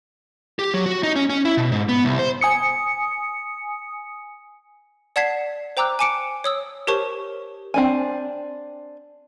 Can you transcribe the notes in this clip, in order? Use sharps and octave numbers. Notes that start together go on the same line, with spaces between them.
G4
F#3
F#4
D#4
C#4
C#4
E4
B2
G#2
B3
C2
C5
G#5 D#6 C#7
D5 F#5 A5 G#6 B6 C7
C5 G5 A#5 D6 E6 F#6
G#5 A5 D6 C#7 D7
C#5 D#6 E6
G4 A#4 C5 C#5 A5 C#6
C4 D4 G#5